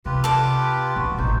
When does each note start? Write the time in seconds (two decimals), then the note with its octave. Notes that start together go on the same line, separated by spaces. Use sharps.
0.06 C3 F4 G4 B4
0.24 A4 D5
0.96 B1 F#4
1.18 A1 D#4 C5